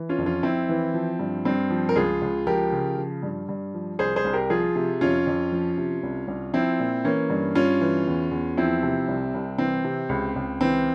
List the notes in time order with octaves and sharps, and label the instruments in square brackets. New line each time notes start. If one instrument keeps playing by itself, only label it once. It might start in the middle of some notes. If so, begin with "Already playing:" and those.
Already playing: [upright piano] E3
C#4 F4
F2
C#4 F4
F2 C4 E4
E3
F3
G2
G2 C4
F3
A#4
C#2 F4 G#4
C#2
F3 G4 A#4
C#3
F3
G2
G2
F3
C2 G#4 C5
G#4 C5
C2
G4 A#4
F3 F4 G#4
C3
F2 C#4 F4
F2
F3
C3
C2
C2
F3 C4 E4
A#2
E3 A#3 C#4
G2
G2 C#4 F4
E3
E2
E2
F3 C4 E4
C3
C2
C2
E3 C4
C3
C#2
C#2
E3 C4